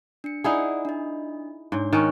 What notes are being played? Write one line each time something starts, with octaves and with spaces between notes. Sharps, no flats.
D4 C#7
D#4 E4 G#4 D5 F#5 G#5
D4 D#5
G#2 D4 C#5
D#3 C#4 D#4 A#5 F#6